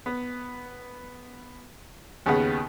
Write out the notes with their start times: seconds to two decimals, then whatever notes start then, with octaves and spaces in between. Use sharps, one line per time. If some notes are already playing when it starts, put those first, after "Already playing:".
0.06 B3
2.26 D#2 C#3 B3 F#5